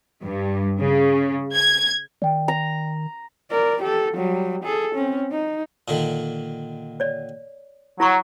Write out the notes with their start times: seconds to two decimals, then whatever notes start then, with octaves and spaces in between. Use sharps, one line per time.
0.23 G2
0.80 C#3
1.54 G#6
2.22 D#3 D5 G5
2.48 A#5
3.50 A#4 D5
3.83 G4 A4
4.14 F#3 G3
4.64 G#4 A4
4.95 C4 C#4
5.31 D#4
5.88 A#2 D3 D#3
7.00 C#5 D5
8.00 F#3 E4 A#5 C#6